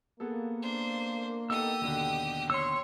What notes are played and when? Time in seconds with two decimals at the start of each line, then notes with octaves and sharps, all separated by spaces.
0.20 A#3 B3 G#4 A4
0.62 D4 C5
1.50 B3 D#4 G4 A4 D#6 E6
1.82 D#2 B2 D3
2.50 C#5 C6 E6